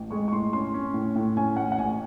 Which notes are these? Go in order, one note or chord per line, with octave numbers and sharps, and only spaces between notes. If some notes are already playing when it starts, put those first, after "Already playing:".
Already playing: A1
G#3 C#6
C#6
A2 C6
C#4 C6
C#4
A2
A2
C#4 G#5
A1 F#5
F#5
A1 G#5